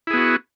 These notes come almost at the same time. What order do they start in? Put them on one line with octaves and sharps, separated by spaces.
E4 G#4 B3 F#4